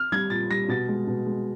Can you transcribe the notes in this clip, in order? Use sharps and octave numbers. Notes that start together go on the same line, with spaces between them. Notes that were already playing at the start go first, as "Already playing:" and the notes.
Already playing: F6
G3 G#6
A#2 A6
G3 A#6
B2 A6
G#3
B2
G#3